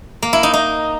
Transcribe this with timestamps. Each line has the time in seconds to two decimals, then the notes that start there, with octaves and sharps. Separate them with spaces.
0.23 A#3
0.33 E4
0.43 D#4
0.54 D#4